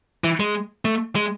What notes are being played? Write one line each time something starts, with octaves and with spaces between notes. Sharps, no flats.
E3
G#3
A3
G#3